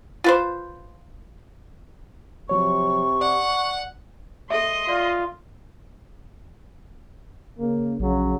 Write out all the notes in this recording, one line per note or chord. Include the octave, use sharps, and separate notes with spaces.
F4 B4 C5
C3 F3 F#3 C#5 C#6
D5 F#5
A4 D#5 E5 C6
F4 D5
C#3 A#3
A#1 C#3 F#3